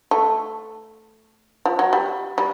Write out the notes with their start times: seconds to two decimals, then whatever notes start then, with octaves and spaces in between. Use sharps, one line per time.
0.11 A3
1.66 F3
1.79 F#3
1.93 G3
2.38 G3